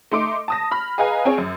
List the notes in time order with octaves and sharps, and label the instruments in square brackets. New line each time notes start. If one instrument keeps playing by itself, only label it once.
[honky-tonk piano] A3 D#4 C6 D6 D7
A5 D#6 A#6
B5 F6
G#4 B4 D#5 F5 G#5 A#5
C4 G#4 C#5
F#2